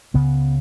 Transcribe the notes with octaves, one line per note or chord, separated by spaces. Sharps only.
C#2 C#3 B3